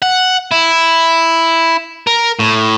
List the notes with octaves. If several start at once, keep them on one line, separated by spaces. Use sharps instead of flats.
F#5
E4
A#4
A2